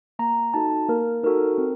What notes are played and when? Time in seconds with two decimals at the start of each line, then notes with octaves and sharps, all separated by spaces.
0.19 A#3 A#5
0.54 D#4 F#4 A4 A5
0.89 A#3 A#4
1.23 D#4 F#4 A4 A#4
1.58 C4